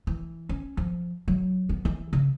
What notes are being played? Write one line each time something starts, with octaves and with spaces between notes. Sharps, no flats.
E3
C#4
F3
F#3
B3
E3
C#3